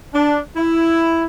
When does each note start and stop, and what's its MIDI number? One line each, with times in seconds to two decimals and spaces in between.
0.13 0.40 62
0.56 1.25 64